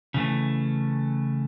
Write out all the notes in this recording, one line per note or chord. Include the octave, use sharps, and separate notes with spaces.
C#3 E3 A3